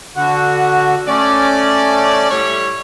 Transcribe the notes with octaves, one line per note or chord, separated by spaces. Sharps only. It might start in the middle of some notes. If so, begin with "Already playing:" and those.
D3 F#4
A3 C#4 D5
A2 G3 C#5